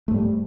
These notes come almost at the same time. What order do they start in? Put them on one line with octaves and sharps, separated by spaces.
A3 G#2 G3